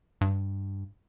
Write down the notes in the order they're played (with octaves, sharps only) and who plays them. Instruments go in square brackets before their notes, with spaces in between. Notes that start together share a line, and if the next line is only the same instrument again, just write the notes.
[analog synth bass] G2